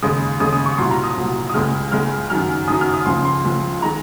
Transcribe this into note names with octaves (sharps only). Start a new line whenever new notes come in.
D#2 C#3 G#3 D#6
D#2 C#3 G#3 D#6
D#6
C#6
C2 A#2 F#3 C6
A#5
D#6
C2 A#2 F#3
D#6
C#2 C#3 G#3 F6
C#2 C#3 G#3 F6
F#2 D#3 F#3 F6
F#2 D#3 F#3 D#6
F6
D#6
C#2 C#3 F3 C6
C6
C#2 C#3 F3
D#3 G#3 A#5